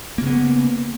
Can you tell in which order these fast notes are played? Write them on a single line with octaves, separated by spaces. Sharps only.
A#3 C#3 B3